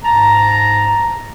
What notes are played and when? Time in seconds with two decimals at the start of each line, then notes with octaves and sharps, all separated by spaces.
0.04 G#2 A5 A#5